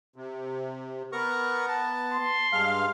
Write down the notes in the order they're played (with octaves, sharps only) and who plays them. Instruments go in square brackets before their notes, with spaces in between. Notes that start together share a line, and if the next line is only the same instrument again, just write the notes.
[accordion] C3
[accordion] B3 [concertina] A#4 A#5 C#6
[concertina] A5
[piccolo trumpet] C6
[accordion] G2 F5 [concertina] G#3 F6